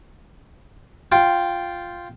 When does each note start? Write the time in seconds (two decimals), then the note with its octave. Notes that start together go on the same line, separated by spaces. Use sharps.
1.12 F4 G5